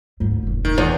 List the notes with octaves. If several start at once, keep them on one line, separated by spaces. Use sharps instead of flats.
D2 G#2
F1 D#2
D#3
E2